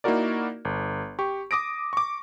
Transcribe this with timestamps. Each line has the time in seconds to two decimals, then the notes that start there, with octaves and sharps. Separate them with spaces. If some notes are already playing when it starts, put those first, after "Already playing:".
0.04 A#3 D#4 E4 F#4 A#4 D5
0.65 G1
1.19 G4 C#6
1.51 D6 D#6 A#6 D7
1.93 C#6 D6